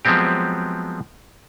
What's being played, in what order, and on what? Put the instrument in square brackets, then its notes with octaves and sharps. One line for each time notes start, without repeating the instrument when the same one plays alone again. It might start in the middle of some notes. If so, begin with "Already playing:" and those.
[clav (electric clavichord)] F3 F#3 G#3 B3 C4 G4